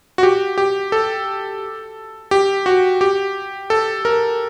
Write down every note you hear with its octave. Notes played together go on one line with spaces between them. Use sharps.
F#4
G4
G4
A4
G4
F#4
G4
A4
A#4